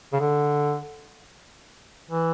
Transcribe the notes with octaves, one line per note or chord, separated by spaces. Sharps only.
C#3
D3
E3